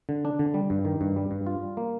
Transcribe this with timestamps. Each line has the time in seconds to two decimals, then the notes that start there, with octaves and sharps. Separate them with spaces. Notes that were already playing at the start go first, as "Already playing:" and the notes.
0.09 D3
0.25 D4
0.39 D3
0.54 G3
0.70 G2
0.85 D#3
1.01 G2
1.16 G3
1.31 G2
1.46 F4
1.62 G3
1.77 A#3